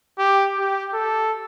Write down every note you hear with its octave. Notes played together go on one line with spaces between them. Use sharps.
G4
G4
A4